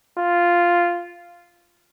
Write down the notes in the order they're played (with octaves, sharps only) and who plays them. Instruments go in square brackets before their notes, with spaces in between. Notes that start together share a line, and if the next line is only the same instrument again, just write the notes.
[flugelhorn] F4